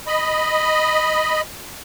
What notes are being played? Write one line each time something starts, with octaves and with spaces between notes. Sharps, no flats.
D#5 B5